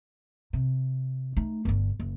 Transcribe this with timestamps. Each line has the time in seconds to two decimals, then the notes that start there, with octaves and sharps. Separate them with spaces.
0.53 C3
1.37 A3 D#4
1.65 G1 D3
2.00 F#1